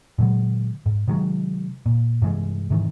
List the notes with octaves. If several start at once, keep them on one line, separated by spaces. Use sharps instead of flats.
A#2 D3 F#3 G#3
G#2
C3 D#3 F#3 G#3
A#2
G2 C3 E3 G#3
G#2 C3 D#3 E3